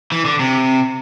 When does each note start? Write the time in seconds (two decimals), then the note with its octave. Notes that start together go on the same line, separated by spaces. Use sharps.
0.12 E3
0.25 D3
0.39 C3